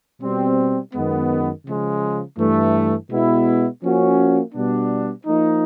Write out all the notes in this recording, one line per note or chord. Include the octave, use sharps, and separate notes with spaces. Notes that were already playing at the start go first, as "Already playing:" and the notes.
B2 G3 C4
F#2 D#3 G#3 B3
C#3 F3 G#3
G2 E3 A3
B2 G#3 B3 E4
F3 A#3 C#4 F#4
B2 G3 B3 D4
F3 A#3 D#4